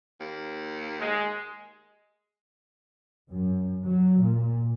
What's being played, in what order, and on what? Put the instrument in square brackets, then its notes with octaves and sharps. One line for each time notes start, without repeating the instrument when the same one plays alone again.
[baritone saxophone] D#2
[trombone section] G#3
[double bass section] F#2
F#3
A#2